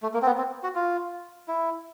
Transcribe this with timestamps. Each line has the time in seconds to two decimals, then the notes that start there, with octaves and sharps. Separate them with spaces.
0.02 A3
0.14 A#3
0.22 C4
0.26 B3
0.38 C4
0.63 F#4
0.75 F4
1.48 E4